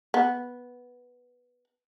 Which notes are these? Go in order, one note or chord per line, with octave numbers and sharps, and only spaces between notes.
B3